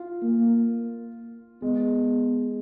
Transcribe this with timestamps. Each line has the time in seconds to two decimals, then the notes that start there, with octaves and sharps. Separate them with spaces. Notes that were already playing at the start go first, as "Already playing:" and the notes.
Already playing: F4
0.22 A#3
1.62 G#3 B3